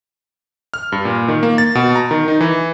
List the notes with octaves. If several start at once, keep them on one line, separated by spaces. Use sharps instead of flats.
F6
G2
A#2
D#3
A#3
A6
B2
A#5
D#3
D#4
E3